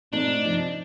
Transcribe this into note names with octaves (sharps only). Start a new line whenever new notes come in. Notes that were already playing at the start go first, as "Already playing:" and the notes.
A#2 A3 C4 D4 D#4
C3 F3 C4 D#4